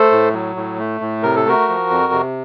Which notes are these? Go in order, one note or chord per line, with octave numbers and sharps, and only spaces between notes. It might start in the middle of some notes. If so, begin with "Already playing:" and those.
Already playing: A3 A4 C5
A2
F#3
A2
A3
A2
C3 A#4
A4
A3 F#4 A#4
F3
F2
C3